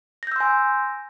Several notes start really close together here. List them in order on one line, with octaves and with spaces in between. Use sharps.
A#6 G6 E6 C6 G#5